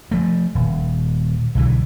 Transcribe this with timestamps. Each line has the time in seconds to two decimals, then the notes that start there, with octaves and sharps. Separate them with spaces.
0.11 F3 A3
0.55 D#1
1.55 B1 D3 E3